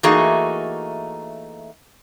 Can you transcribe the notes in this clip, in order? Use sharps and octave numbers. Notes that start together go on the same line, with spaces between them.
E3 A3 A#3 D#4 F#4 G#4